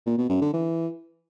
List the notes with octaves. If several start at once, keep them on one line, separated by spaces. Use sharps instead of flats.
A#2
B2
F#2
D3
E3